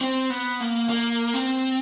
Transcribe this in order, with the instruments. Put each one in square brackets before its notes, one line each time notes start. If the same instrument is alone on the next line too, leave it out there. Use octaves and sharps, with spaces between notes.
[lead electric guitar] C4
B3
A#3
A#3
C4